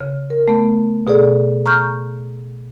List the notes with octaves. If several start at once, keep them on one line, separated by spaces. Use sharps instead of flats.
C#3
A#4
A3 B3
B2 G#4 A4 D5
A#5 C#6 F6 G6